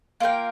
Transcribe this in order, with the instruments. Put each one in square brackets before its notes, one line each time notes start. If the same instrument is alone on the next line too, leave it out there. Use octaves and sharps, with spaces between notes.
[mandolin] A#3 F4 A#4 G5